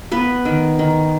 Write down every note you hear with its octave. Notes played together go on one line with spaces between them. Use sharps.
B3 B4
D#3
D#3